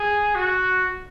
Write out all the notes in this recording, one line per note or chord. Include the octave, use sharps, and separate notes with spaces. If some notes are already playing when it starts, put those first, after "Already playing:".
Already playing: G#4
F#4